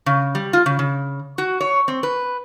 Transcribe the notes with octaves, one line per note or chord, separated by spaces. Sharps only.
C#3
G3
F4
C#3
C#3
F#4
C#5
C4
B4